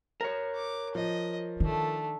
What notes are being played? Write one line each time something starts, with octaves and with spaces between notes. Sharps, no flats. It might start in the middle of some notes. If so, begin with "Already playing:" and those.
A#4 C#5
D6
F3 D#5
D#3 A3 D4